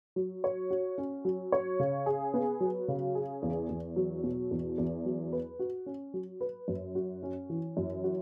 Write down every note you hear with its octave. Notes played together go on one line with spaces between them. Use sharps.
F#3
C#5
F#4
C#4
F#3
C#5
C#3
G#4
B3
F#3
C#3
G#4
E2
E2
F#3
B2
E2
E2
F#3
B4
F#4
C#4
F#3
B4
F#2
F#4
C#4
E3
F#2
F#4